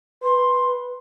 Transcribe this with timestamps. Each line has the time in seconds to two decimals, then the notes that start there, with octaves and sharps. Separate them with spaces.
0.23 B4 C6